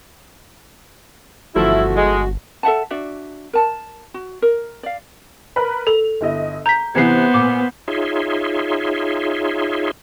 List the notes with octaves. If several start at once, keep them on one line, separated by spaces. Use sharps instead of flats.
G1 E3 F3 A3 E4 F#4
G#3
A4 E5 F#5 A5
D4 F#4 D5 E5
A#4 A5
F#4
A#4
D5 F5
A#4 B4 B5
A4 F7
G1 E4 D#5
A#5 G6 B6
C3 E3 B3 C5 G#6 C7
A#2 D6
D#4 F4 G#4 C#5 E5 C6